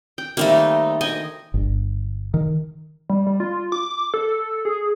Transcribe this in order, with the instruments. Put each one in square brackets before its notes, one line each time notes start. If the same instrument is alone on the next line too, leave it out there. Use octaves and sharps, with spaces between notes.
[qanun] G5
[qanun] D#3 G3 A#3 [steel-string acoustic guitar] A3 C4 D#4
[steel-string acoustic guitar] D2 [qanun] D#5 G5 G#5
[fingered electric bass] G1
D#3
[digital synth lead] G3
G3
F4
D6
A4
G#4